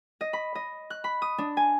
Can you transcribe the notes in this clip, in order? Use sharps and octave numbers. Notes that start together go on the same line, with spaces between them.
D#5
B5
D#5
F#6
B5
D#6
D4
G#5